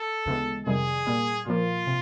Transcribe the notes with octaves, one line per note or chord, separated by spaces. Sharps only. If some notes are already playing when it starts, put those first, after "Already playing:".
Already playing: A4
D2 C#3 E3 G#3 B3
F2 C3 D#3 G3 G#4
A#2 G3 A#3
A#2 F3 A#3 F4
C3